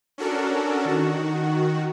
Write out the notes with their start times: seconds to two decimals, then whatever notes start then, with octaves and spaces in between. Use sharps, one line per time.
0.18 C#4 D4 F#4 A4 A#4
0.85 D#3 F#4